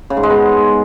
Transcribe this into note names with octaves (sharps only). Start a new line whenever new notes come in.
C#3
G#2
G#3
B3